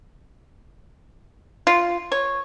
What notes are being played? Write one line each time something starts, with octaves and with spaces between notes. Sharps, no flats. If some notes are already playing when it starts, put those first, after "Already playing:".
F4
C#5